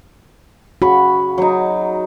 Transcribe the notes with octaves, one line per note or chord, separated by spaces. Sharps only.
C#3 F#4 B5 C#6
F#3 D#4